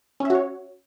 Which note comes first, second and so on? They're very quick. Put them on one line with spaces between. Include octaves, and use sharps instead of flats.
C#4 E5 F#4 C#5